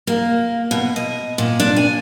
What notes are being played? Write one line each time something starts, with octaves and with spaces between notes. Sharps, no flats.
A#3
B2
D#5
A#2
D4
G#5